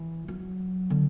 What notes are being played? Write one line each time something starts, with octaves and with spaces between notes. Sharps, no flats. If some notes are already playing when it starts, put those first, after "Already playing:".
Already playing: E3
F#3
D3